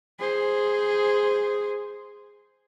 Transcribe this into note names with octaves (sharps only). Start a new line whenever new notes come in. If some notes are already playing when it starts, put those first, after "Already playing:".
G#4 C5